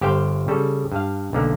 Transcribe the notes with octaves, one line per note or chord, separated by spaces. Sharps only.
G1 G4 C5 F5 G5
C#3 G3 A4
G2 F5
B1 D3 A#3